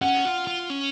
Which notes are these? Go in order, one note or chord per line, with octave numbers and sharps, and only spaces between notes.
C#4 F#5
F4
F4
C#4